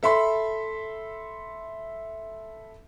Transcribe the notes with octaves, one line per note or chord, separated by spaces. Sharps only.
A4 E5 B5 C6